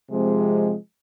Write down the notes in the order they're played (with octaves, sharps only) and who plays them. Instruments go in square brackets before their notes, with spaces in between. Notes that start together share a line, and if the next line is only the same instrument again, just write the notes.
[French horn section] C3 F3 G#3 C4